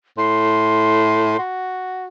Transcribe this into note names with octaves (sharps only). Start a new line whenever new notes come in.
A2 C6
F#4